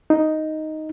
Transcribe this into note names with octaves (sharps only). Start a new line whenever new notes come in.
D#4